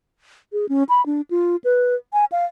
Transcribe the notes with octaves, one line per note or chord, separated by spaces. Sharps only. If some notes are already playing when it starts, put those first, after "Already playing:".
G#4
C#4
B5
D4
F4
B4
G#5
F5